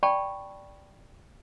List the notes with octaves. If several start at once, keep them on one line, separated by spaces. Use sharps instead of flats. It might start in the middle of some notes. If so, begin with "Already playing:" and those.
D5 G5 A5 B5 C#6